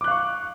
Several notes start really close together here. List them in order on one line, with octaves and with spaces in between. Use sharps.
D6 F#6 F5 C#6